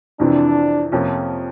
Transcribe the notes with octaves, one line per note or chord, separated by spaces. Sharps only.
F2 C3 E3 D4
F2 C3 F3 A#3 C#4